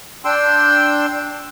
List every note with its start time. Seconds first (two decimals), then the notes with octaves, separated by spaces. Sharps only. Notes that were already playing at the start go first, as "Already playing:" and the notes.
0.25 D4 G5 C6 E6